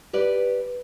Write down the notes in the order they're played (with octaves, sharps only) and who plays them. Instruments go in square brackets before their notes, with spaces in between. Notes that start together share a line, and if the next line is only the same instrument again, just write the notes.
[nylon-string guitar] G4 B4 D5